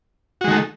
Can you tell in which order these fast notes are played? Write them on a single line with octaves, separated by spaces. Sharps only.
F#4 G#3 D#3 A3